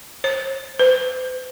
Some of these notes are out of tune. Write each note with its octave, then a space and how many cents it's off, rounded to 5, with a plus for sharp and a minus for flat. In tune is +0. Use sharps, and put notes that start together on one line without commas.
C5 +40
C5 -45